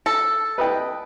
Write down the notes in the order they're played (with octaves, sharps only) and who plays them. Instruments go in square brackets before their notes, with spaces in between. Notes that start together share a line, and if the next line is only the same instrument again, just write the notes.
[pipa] A4
[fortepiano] B4 D#5 G5